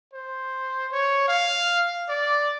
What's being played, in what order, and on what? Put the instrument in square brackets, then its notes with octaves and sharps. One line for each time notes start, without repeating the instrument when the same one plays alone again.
[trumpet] C5
C#5
F5
D5